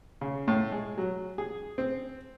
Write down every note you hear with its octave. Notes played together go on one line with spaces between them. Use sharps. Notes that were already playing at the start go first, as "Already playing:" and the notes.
C#3
A2
G#3
F#3
G#4
C4